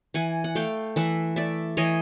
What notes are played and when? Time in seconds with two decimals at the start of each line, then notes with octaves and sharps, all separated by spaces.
0.14 E3 F#5 G#5
0.44 F#5
0.55 A3 F5 G5
0.96 E3 E5 F#5
1.36 A3 D5 E5
1.77 E3 C#5 D#5